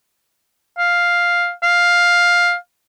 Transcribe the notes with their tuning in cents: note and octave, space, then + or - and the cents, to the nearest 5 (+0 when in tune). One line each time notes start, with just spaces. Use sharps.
F5 +5
F5 +10